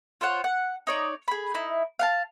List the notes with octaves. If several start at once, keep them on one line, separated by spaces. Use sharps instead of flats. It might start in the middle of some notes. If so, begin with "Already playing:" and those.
F4 C5 C#5 F#5
F#5
D#4 C#5 D5
G#4 B5
D#4 E4
F5 F#5 A5